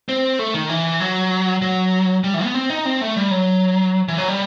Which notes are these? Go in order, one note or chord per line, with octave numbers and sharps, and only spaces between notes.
C4
A3
D#3
E3
F#3
F#3
G3
E3
B3
C4
D#4
C4
A3
G3
F#3
E3
F#3
G3